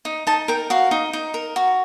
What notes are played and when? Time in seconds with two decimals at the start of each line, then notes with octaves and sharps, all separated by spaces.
0.05 D#4
0.27 D#4 A5
0.48 A#4 G5
0.70 F#4 F5
0.91 D#4
1.13 D#4
1.34 A#4
1.56 F#4